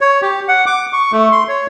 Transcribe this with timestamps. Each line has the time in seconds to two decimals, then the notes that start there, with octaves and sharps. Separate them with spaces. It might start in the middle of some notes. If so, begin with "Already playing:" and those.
0.01 C#5
0.22 G4
0.48 F#5
0.66 D6
0.93 C#6
1.12 A3
1.32 C6
1.48 C#5